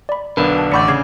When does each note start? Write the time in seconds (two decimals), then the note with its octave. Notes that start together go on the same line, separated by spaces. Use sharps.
0.09 D5 B5
0.37 B1 D3 B3 D4 A#4 B4 B5
0.58 A5
0.72 A1 D5 F#5 B5 C#6 G6 C#7
0.88 C#3 G#6 C7